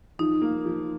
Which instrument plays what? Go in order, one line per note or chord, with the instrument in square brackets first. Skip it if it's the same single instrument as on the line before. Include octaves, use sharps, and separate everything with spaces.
[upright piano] F3 [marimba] D#4
[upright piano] A#3
F3